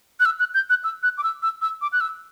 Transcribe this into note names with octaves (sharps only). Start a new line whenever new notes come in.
F#6
E6
F#6
G6
F#6
E6
F#6
D6
E6
E6
E6
D6
F#6
E6